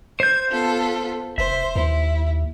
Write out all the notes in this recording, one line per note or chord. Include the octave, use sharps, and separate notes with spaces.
C5 G6 G#6
B3 F4 A4
F1 C5 E5
D#2 E4